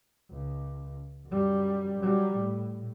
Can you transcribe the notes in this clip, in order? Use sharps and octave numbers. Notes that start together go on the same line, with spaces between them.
C#2
F#2 G3
F#3 G3
A2